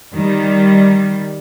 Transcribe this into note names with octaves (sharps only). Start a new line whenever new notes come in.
D#3 G3